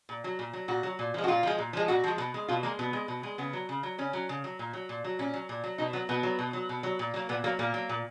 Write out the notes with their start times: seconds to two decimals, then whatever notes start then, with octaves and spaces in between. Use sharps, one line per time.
0.09 A#2
0.24 F#3
0.39 A#2
0.53 F#3
0.68 A#2 F#4
0.83 F#3
0.99 A#2
1.14 F3 G#3
1.24 F#4
1.28 A#2 F4
1.43 F3 G#3
1.58 A#2
1.73 F3 G#3
1.88 A#2 F#4
2.04 F3 G#3
2.18 B2
2.34 G#3
2.48 B2 F4
2.63 G#3 A#3
2.79 B2 B3
2.93 G#3
3.08 B2
3.23 G#3
3.38 C#3 B3
3.53 F#3
3.69 C#3
3.83 F#3
3.98 C#3 C#4
4.13 F#3
4.29 C#3
4.44 F#3
4.59 A#2
4.73 F#3
4.89 A#2
5.04 F#3
5.19 A#2 C#4
5.34 F#3
5.49 A#2
5.64 F#3
5.78 B2 D#4
5.93 F#3 B3
6.09 B2 B3
6.23 F#3
6.39 B2
6.53 F#3
6.69 B2
6.83 F#3
6.99 A#2
7.14 F#3 A#3
7.29 A#2 B3
7.44 F#3 A#3
7.59 A#2 A#3
7.74 F#3
7.89 A#2